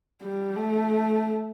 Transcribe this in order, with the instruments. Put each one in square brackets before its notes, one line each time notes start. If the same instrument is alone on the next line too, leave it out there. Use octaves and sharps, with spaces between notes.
[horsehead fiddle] G3
A3